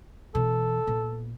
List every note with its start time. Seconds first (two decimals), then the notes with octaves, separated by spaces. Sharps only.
0.35 B2 E3 A4
0.87 A#2 B3